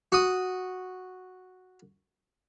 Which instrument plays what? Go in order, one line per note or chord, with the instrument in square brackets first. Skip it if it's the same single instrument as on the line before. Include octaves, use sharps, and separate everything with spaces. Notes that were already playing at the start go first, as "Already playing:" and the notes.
[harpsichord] F#4 D#6